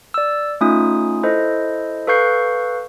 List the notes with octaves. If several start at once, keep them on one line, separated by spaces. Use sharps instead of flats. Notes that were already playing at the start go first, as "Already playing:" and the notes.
D5 E6
A3 C#4 D#4 F4 D#6
E4 A4 C5 D#5
A4 B4 F5 C#6 G6 C7